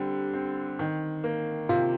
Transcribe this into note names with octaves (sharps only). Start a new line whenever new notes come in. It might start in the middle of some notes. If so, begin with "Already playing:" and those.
Already playing: D3 G3 C4 G4
C4
D#3
A#3
C3 F4